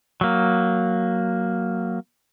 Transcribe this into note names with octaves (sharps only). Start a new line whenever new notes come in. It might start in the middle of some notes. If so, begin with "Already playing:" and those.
F#3 A#3